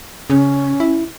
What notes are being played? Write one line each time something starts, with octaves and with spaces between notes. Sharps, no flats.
C#3 C#4
E4